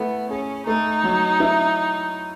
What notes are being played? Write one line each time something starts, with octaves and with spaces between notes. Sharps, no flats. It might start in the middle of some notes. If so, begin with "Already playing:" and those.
Already playing: A3 B3 E4
C#4 G#4
A3 D#4
F#3
E4